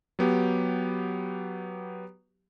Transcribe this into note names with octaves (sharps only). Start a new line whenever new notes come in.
F#3 B3 G4